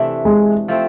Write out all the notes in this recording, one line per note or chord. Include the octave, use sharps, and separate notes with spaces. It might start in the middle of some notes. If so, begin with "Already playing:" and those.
Already playing: C3 E3 A3 D4
G#3
F3 A3 C4